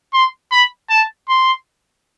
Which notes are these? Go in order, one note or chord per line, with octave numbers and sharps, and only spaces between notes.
C6
B5
A5
C6